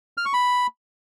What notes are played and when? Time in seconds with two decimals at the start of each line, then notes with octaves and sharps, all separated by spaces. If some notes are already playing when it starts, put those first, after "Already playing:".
0.18 F6
0.25 C#6
0.33 B5